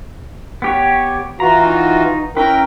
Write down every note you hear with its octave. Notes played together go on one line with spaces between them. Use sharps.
B3 G4 C#5
E3 F4 F#4 A#5
D#4
C#4 E4 A#4 B4 G5